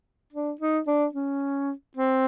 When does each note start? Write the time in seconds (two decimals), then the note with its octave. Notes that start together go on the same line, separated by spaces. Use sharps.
0.33 D4
0.61 D#4
0.87 D4
1.14 C#4
1.97 C4